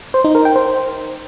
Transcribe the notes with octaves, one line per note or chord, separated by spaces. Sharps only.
C5
D#4
A#4
G5
C5